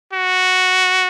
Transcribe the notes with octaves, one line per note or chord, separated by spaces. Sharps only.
F#4